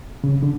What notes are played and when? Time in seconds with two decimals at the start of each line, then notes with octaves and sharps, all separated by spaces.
0.24 C#3
0.43 D3